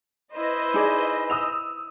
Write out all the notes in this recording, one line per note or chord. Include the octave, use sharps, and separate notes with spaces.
E4 B4 C5 D#5
D#4 G#4 D5
D#6 E6 F7